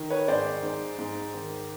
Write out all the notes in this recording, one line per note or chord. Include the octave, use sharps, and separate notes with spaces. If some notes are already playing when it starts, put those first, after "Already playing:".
Already playing: D#3
B4 C#5
G#2 C5 D5
G#2
G#2
D#3